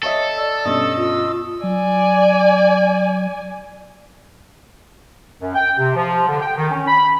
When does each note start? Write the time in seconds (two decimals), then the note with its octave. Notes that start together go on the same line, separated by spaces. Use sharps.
0.03 A4 C#5 D#5 E5
0.38 D5 E6
0.65 G2 B2 C#4 D#5 E6
0.97 F4
1.63 F#3 D5 G#5
5.41 F#2
5.55 G5
5.79 C3
5.96 F3
6.28 D3
6.41 G5
6.57 D#3
6.71 C#4
6.88 B5